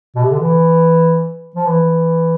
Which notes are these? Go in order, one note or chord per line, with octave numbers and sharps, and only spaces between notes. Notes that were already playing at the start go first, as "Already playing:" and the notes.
B2
C3
D3
E3
F3
E3